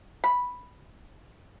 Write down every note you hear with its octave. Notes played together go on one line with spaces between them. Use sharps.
B5